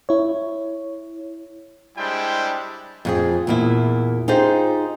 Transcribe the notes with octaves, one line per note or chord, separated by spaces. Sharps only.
E4 C#5
G3 G#3 D4 E4 C5 G5
F2 F#4 G#4
E2 A#2 E4
D#4 F4 G4 G#4 C5